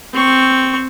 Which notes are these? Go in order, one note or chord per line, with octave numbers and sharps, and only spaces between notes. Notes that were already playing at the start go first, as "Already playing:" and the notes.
C4 C#6